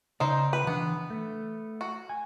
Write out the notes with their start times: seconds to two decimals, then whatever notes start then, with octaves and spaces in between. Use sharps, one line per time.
0.20 C#3 D#4 C5 D5
0.53 B4
0.67 E3 B3 D4
1.10 A3
1.81 F#4
2.09 G#5